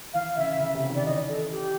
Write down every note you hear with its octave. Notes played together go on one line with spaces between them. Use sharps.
E3 F5
C#3 E5
C#3
C3
D#3
D5
E3 D#5
A4
G4